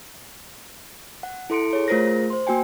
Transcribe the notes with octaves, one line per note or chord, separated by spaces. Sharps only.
F#5
E4 A4 C6 C#7 D7
G#4 C#5
A3 F4 G#4 A#4 C5 A#6
C5 C6
A#3 F#4 G5 G#5